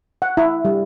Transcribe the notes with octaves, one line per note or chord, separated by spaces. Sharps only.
F#5
E4
G3